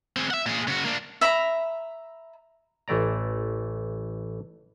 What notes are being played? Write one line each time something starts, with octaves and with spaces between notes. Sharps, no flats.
C4 G#4
E5 F#5
A#2 G#4
C#3 F#4
A#3 D4
E5 A#5 B5
A1 E3 A3 D5 A#5